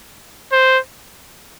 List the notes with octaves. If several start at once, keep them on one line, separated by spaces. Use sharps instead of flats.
C5